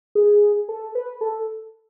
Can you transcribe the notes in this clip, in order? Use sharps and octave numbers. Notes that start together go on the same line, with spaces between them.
G#4
A4
B4
A4